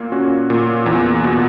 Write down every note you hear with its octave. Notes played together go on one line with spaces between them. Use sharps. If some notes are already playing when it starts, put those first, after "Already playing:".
Already playing: A#2 A#3
C#4 F#4
A#2
E2
B2